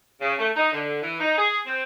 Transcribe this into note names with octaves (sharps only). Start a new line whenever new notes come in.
C#3
A3
D#4
D3
E3
D#4
G#4
C4